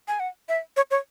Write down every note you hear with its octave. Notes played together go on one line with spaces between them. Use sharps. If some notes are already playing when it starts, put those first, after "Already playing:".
G#5
F#5
E5
C#5
C#5